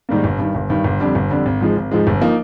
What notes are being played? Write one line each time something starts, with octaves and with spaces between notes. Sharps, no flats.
G#2 D#3 G3 A#3
G1
G2 D#3
G1
G2 D#3
G1
F2 D3 G3
G1
F2 D3 G3
G#1
G#2 F3 G#3
G#1
G#2 F3 G#3
G1
F3 A#3 D#4